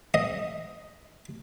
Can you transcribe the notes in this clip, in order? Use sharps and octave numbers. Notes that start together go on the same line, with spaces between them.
D#5